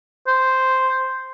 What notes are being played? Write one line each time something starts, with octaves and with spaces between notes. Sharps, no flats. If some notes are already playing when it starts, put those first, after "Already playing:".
C5